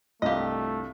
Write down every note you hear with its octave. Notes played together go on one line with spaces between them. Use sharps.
C2 G2 A3 F4 G4 D#5 F5